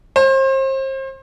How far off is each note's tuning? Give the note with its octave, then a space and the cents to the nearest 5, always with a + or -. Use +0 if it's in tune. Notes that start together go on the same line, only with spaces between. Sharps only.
C5 +35